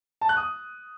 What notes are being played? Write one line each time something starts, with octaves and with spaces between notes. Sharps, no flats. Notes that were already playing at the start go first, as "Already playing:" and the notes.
A5
F#6
D#6